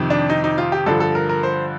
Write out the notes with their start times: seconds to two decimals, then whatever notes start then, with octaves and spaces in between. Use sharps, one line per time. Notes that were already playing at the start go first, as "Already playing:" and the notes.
Already playing: F2 C3 D#3
0.10 D4
0.30 D#4
0.44 D#4
0.58 F4
0.72 G4
0.86 G2 D3 F3 A4
1.00 A4
1.15 A#4
1.29 A#4
1.43 C5